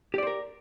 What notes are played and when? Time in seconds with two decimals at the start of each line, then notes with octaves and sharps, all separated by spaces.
0.14 G4
0.18 D5
0.23 C5
0.27 A#4